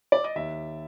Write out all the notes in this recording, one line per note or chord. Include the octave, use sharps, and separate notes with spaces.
D5
D#5
D#2 E5